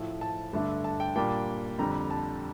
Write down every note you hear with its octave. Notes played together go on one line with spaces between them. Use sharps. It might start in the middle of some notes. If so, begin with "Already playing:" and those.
Already playing: A2 F3 A3
A5
G2 D3 A3 D4
A5
G5
A#2 G3 A#3 D4 G5
F2 D3 G3 A#5
A5